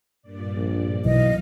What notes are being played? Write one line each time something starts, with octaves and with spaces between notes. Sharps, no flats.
G2 A#2 D5
A#1
B1 E3 D#5 F5